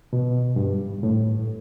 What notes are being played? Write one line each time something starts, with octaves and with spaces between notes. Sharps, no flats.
B2
G2
A2